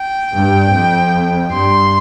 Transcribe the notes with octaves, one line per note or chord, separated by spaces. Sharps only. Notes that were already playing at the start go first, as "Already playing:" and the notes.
Already playing: G5
G2
F2
G2 C6